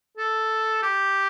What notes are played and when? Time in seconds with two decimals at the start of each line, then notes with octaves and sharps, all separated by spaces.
0.17 A4
0.82 G4